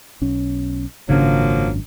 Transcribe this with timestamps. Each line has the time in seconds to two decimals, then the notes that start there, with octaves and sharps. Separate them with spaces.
0.21 B1 C#4
1.09 G#1 F#2 C#3 F3 F#3 A#3 D4